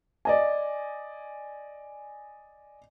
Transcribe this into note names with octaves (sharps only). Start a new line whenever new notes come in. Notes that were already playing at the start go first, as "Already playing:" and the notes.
D5 D#5 G#5